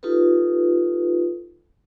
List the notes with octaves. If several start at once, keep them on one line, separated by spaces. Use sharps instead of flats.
D#4 F4 G4 A4 B4